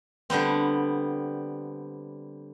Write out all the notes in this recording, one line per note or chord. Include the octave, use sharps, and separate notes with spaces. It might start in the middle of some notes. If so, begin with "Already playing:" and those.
D3 G3 B3 C4